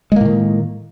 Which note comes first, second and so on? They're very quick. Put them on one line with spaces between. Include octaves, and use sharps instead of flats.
G#3 A#3 A2 D#3